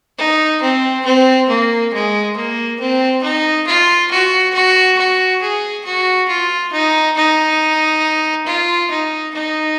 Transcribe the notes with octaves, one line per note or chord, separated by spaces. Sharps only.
D#4
C4
C4
A#3
G#3
A#3
C4
D#4
F4
F#4
F#4
F#4
G#4
F#4
F4
D#4
D#4
F4
D#4
D#4